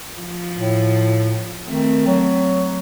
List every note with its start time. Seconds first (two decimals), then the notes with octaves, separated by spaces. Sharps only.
0.18 F3
0.57 A2
1.67 D#3 A3 C4
2.07 F#3